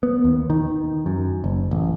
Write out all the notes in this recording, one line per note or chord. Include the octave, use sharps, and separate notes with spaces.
B3
D#2
D#3
F#2
F#1
A1